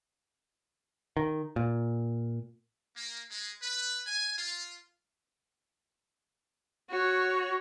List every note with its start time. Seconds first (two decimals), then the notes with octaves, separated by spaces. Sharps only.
1.17 D#3
1.56 A#2
2.95 A#3
3.30 G#3
3.61 B4
4.06 G#5
4.37 F4
6.90 F#4 C#5